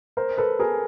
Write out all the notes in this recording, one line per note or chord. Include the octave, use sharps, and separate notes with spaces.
A#4 C5
A4 B4
G#4 A#4